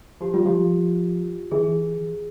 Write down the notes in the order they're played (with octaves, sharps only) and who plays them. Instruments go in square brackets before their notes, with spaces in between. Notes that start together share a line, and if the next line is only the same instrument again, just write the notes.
[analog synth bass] F3 [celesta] G4
[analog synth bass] G3 [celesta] F4
[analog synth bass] F3 [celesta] G4
[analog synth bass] E3 [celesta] G#4